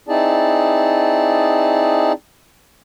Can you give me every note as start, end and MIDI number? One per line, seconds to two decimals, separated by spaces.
0.08 2.13 60
0.08 2.13 63
0.08 2.13 64
0.08 2.13 68
0.08 2.13 74
0.08 2.13 81